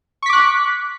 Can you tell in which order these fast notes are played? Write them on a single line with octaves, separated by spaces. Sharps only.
C#6 B6 D6 F#6